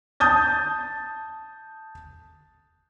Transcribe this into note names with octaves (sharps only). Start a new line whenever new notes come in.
A5 D#6 G6 A6